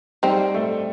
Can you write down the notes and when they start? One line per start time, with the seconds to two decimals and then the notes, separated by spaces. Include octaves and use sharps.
0.23 G3 C4 D#4
0.54 A3